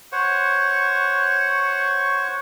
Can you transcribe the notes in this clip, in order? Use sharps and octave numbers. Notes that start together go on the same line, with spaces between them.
C5 C#5 F#5 C#6